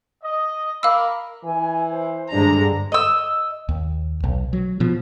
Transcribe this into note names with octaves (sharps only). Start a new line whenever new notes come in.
D#5
A#4 F5 B5 D6 E6
E3 G#5
C5
G2 D3 G#3 D4 A#5
D#5 E6
D#2
B1
F#3
B2 F3